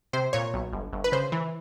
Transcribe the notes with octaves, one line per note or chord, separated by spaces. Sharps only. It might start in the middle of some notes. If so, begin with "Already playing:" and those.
C3 C5
A#2 C#5
B1
G1
G1
B4
C#3 C5
E3